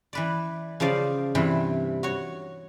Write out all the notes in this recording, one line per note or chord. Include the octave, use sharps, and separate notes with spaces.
E3 B4 D5
C#3 F3 C5 D5 F5
G2 C3 E3
F#4 C#5